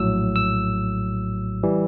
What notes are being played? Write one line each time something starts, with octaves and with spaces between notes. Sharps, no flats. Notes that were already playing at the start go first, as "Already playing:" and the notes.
Already playing: A#1 A2 F#3 E6
E6
E3 G3